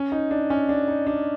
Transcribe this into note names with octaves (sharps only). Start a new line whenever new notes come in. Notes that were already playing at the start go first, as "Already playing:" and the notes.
Already playing: C#4
D#4
D4
C#4
D4
D#4
D4